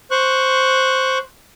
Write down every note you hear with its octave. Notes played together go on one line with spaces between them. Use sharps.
C5 C#6 F#6